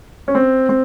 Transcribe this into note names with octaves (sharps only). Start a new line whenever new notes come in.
C#4
C4
C4